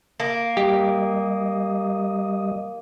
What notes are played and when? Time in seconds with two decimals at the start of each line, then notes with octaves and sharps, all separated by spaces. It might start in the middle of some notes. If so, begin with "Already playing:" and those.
0.20 A#3
0.57 G3 G4 D#5